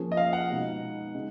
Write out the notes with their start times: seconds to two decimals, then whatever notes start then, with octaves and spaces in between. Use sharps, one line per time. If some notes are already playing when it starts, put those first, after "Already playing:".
Already playing: F3 A#3 C#4 F4 G#4
0.12 D#5
0.17 F5
0.33 F#5
0.49 B2 G#3 D#4
1.14 C#3 G#3 D#4